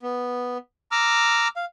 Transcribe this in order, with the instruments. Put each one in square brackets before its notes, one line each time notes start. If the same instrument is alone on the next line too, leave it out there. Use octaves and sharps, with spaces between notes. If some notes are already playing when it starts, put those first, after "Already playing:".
[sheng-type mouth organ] B3
A#5 D6 E6 F6
F5